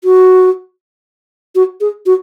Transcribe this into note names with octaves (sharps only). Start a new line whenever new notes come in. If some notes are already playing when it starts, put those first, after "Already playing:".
F#4
F#4
G#4
F#4